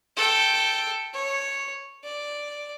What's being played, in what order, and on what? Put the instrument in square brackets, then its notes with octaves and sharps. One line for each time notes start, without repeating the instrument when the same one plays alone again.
[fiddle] A4 G5
C#5
D5